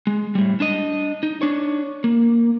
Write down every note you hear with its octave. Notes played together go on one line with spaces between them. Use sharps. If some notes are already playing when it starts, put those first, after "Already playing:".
G#3
A2 G3
D4 D#5
D#4
D4 C#5
A#3